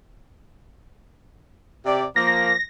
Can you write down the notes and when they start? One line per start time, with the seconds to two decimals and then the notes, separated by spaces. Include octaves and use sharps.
1.86 C3 G4 D5
2.16 F3 A#3 A#6